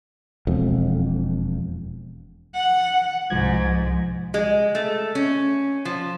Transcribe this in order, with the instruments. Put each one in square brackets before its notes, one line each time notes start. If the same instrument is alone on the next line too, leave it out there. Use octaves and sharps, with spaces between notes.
[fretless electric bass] E1 F2
[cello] F#5
[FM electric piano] C2 F3 G#6 [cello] G#2
[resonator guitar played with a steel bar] G#3
A3
C#4
F3